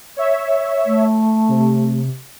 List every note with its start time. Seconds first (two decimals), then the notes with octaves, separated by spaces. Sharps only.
0.17 C#5 E5
0.86 A3
1.49 C3